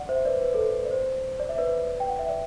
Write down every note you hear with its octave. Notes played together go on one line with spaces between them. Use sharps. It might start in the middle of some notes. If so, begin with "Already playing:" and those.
Already playing: D5 F#5
C5 E5
B4 D5
B4
A4
B4
D5
C5
D5
E5
B4 D5
G5
F#5
E5
D5